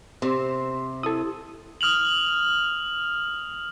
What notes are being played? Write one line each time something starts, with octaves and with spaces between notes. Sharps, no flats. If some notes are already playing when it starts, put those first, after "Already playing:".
C3 C4 C5
E4 A4 D#6
D#6 F6 F7 F#7